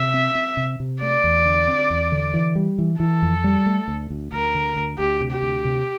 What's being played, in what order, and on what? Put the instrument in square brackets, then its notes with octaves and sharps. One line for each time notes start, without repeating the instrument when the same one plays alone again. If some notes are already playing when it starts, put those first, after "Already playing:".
Already playing: [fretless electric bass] C3 [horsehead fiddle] E5
[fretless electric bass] C4
C4
C3
C3
[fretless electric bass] A3 [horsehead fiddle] D5
[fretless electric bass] E2
D3
C4
E2
D3
E3
G3
E3
[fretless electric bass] E3 [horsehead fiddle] A4
[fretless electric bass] F2
G3
A3
D2
D2
[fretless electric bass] D2 [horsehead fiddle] A#4
[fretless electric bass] D3
D2
[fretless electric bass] D2 [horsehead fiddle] G4
[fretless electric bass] C3
[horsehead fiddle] G4
[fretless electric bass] D2
C3